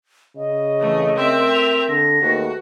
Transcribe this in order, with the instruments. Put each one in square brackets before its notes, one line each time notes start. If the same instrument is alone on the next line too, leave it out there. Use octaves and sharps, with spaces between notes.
[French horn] C#3 [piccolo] D#5
[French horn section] F2 E3 [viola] A3
[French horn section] A3 A#4 [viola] C4 E5
[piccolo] F7
[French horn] D3 [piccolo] A#6
[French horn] D#2 [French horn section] A3 G#4 B4 [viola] F#4